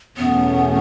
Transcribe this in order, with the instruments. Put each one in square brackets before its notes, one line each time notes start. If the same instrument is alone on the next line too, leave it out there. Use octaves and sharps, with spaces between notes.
[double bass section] E2 B2 A3 C#4 [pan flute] B3